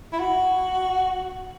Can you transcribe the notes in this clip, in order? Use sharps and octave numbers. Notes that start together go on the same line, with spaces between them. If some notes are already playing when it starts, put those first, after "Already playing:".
E4
F#4